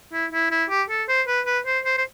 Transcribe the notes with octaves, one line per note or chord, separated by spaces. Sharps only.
E4
E4
E4
G4
A4
C5
B4
B4
C5
C5
C5